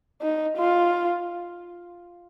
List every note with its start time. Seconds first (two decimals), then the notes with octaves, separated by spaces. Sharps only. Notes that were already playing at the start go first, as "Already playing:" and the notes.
0.22 D#4
0.57 F4